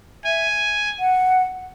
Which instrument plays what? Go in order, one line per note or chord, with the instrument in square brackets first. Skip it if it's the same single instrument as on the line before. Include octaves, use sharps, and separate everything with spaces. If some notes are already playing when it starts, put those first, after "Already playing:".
[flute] E5 [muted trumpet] G#5
[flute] F#5